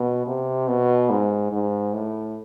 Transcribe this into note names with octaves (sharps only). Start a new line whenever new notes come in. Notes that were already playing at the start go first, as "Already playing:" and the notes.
Already playing: B2
C3
B2
G#2
G#2
A2